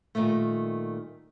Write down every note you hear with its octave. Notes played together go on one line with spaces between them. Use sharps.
A#2 D#3 G3 A3